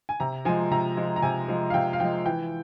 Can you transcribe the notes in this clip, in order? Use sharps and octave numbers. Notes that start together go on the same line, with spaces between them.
G#5
C3 A#5
F3 G#3 G#5
C3 A#5
F3 G#3
A#5
C3 G#5
F3 G#3
F5
C3 G5
F5
F3 G#3 G5
E3 G5